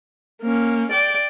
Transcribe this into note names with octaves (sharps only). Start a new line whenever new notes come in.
A#3 C#4
D5 G5